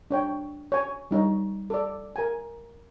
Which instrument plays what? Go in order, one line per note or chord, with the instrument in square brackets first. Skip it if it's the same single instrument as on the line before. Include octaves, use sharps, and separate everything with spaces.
[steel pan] D4 C#5 G5
C#5 G#5
G3 D#4 C#5
A4 D5
A#4 G#5